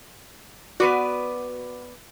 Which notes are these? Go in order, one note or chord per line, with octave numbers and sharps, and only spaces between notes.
B3 F#4 B4 D5